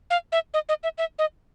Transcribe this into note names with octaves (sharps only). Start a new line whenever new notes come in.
F5
E5
D#5
D#5
E5
E5
D#5